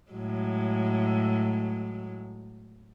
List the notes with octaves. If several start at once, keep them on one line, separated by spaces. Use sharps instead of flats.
A2 F#3 G#3